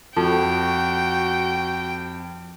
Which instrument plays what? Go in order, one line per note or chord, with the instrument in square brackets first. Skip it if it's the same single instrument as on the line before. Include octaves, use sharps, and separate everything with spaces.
[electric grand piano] F2 [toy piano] F4 A4 A5 [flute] F#4 [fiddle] G5